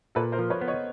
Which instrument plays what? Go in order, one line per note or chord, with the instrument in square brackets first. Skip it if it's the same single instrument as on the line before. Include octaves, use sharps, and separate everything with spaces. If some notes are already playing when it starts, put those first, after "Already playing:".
[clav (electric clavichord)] A#2 [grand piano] A4 B4
[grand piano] A#4 C5
[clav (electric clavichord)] F3
[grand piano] B4 C#5
[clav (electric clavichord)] B3
[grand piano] C#5 D#5